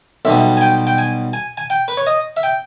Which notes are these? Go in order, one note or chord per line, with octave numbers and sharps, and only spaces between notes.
B1 B2 G3 E5
G#5
G5
G5
G#5
G#5
G#5
G5
B4
C#5
D#5
E5
G5